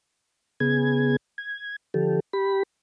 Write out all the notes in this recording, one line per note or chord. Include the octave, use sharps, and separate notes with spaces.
C#3 B3 G#4 G#6
G#6
D3 F3 G4 A4
G4 B5